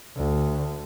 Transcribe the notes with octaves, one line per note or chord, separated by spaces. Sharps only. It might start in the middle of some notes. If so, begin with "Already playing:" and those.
D2